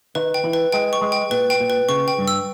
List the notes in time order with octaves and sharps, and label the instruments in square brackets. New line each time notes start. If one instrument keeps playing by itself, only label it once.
[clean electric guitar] D#3 [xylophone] B4
[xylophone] G5
[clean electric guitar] E3
[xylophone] B4
[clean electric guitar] G#3 [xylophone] G5
[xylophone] C#6
[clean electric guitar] G#3
[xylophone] G5
[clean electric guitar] A#2 [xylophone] B4
[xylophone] G5
[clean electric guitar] A#2
[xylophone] B4
[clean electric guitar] C#3 [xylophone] C#6
[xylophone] G5
[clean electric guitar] G2
[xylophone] E6